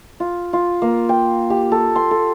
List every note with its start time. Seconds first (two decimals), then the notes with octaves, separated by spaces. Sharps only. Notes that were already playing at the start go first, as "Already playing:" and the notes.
0.20 F4
0.53 F4
0.82 A#3
1.09 G5
1.50 G4
1.72 A4
1.96 C6
2.11 A4